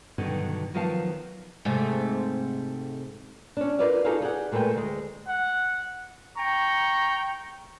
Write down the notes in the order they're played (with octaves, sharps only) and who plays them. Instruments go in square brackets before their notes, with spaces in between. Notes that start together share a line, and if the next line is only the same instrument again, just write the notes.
[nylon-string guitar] G2 B2 D3 D#3 F#3
D#3 F3 F#3 B3 F5 A5
[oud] G#2 C3 A3
[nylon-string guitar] C#4 D4
F4 A#4 B4 D5 D#5 F5
D#4 F#4 G#4 A4 B4 F5
G4 G#4 D5 F#5
A#2 G#3 A3 A#4 B4 G5
D2 G#3
[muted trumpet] F#5
[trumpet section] G5 A#5 C#6